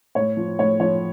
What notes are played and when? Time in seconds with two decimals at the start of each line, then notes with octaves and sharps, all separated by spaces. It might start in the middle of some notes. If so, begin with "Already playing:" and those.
0.15 A2 C#5
0.37 F3
0.59 A2 C#5
0.80 F3 C#5